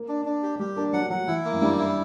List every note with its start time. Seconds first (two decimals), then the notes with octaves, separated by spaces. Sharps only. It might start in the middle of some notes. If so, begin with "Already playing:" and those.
Already playing: A#3
0.08 D4
0.25 D4
0.43 G4
0.59 G3 G4
0.76 A#3 D4
0.93 F#3 F#5
1.10 F#3 F#5
1.27 E3 E4
1.44 A#3
1.53 F#2
1.61 G2 G3
1.78 E4